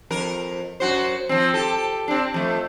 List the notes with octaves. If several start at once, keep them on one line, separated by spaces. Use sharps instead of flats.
F2 A#4
F#2 F#4 C5
F3 C4
G4 A4
C4 D4
F2 A3